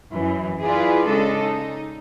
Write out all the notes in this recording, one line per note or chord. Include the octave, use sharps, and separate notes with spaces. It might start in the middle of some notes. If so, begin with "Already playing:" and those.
F#2 E3
E4 F4 G#4 B4 D5
C#3 G#3 D4 A4 D#5
D#4